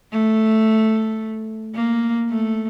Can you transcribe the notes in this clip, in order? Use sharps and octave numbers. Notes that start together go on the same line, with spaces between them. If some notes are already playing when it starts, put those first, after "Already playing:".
A3
A#3
A3